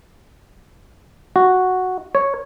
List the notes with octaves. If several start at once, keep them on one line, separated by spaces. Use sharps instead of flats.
F#4
C#5